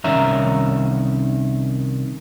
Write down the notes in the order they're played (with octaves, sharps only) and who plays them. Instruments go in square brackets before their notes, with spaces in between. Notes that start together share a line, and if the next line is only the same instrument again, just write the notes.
[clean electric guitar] C2 D#3 C#4 C#5 E5 A#5